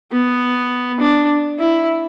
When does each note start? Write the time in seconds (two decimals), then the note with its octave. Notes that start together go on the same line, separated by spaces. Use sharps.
0.12 B3
1.00 D4
1.59 E4